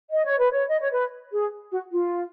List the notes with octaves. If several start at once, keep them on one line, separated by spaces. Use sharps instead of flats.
D#5
C#5
B4
C#5
D#5
C#5
B4
G#4
F#4
F4